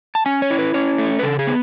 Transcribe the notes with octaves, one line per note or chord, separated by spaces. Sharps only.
A5
C#4 G#5
C#5
E4
B4
C#4 C#5
A3
B4
C#3 A4
G#4
B3